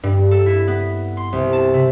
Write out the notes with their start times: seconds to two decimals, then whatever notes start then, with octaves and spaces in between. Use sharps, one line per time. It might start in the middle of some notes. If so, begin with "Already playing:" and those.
0.03 G2
0.31 A4
0.46 E4
0.67 B3
1.17 C6
1.32 C2
1.53 A5
1.74 C3